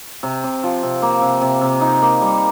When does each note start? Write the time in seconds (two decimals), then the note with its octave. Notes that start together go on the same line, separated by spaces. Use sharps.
0.23 C3
0.44 C3
0.63 F3
0.83 C3
1.02 A#3
1.22 C3
1.42 C3
1.61 C3
1.81 D#4
2.02 A#3
2.21 G3